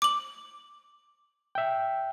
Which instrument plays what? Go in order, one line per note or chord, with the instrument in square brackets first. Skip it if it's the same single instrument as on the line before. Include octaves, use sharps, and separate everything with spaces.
[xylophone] D6 F#7
[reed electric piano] E5 G5